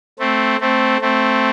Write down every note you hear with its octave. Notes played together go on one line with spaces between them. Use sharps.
A3 C4
A3 C4
A3 C4